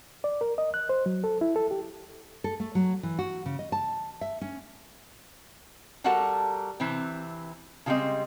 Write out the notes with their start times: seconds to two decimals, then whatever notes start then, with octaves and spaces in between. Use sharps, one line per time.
0.24 D5
0.41 A#4
0.58 D#5
0.74 F#6
0.89 C5
1.06 F#3
1.24 A4
1.41 E4
1.56 A4
1.71 G4
2.44 A4
2.60 A3
2.75 F#3
3.03 E3
3.19 F#4
3.46 C#3
3.59 D#5
3.72 A5
4.21 E5
4.41 C#4
6.04 G3 F#4 A4 A#4 F#5 A5
6.80 C3 E3 C4
7.86 C#3 F3 G3 G#3 C4 D#5